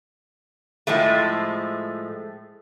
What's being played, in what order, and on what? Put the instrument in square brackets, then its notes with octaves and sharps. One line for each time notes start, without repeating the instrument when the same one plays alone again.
[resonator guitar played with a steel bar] A2 F3 G#3 A3